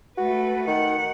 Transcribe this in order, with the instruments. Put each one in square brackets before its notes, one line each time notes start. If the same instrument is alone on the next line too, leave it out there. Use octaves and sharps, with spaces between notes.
[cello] A3 B4 [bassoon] F#4
[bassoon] D#3 [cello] F#5